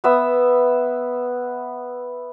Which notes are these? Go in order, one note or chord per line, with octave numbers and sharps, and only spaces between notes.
B3 E5 D#6